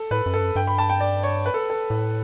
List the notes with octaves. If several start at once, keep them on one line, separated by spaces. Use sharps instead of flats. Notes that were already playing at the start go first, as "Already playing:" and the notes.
Already playing: A4
A2 B4
F#2
G2 A4
F#2
G2 G5
B5
A5
G5
D5
C#5
B4
A4
A4
A2